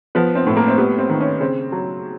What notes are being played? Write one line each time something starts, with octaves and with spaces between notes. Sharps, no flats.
F3 B3
C4
A2
A#3
C4
G3 B3
C4
D#3
C#4
C#3 C4
F#3